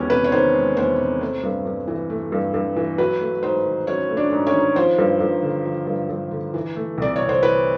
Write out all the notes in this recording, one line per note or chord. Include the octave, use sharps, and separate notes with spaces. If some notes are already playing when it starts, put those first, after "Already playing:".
Already playing: E2 D#3 G#3 C#4 G4 C#5
C3 B4
C#5
D#3 C5
G#3
E2 C5
C3
A3 C5
G2
G2
E3
A3
G2
G2
E3
F#3 B4
A3
G#2 C5
D#3
F#3 C#4 C#5
A3
D4 D5
G#2
C#4 C#5
D#3
F3 C5
G2
G2
D3
F3
G2
G2
D3
E3
A3
C2 D5
C3 C#5
C5
E3 B4